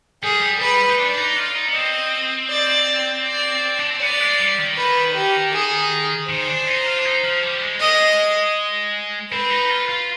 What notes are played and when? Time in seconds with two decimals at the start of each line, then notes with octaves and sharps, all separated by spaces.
0.23 G3 G#4
0.42 G3
0.61 G3 B4
0.90 D#4
0.99 D4 D5
1.18 D#4
1.36 F4
1.55 D#4
1.68 B3
1.74 C4 D#5
2.50 D5
3.26 D5
3.79 D4
3.90 C4
4.01 B3 D5
4.20 G#3
4.39 G3
4.58 D#3
4.77 B4
5.15 G4
5.53 G#4
6.29 D#3 C5
6.48 D4
6.67 D#4
6.86 F4
6.99 D4
7.05 D#4
7.23 F3
7.43 G3
7.61 G#3
7.80 G#3 D#5
9.32 C4 B4
9.50 D#4
9.69 F4
9.89 F4